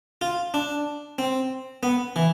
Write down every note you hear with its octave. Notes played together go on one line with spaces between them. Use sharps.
F4
D4
C4
B3
E3